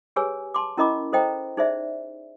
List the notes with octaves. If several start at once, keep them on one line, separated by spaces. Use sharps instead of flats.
G4 G#4 B4 C#5 G#5 E6
A5 C6 D6
C#4 E4 A#4 D#5 B5 D6
A4 C5 D#5 G5 A#5
D#4 G#4 C5 D5 E5